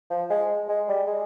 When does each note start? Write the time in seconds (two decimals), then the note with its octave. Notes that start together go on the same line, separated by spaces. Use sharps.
0.10 F3
0.30 G#3
0.68 G#3
0.88 G3
1.07 G#3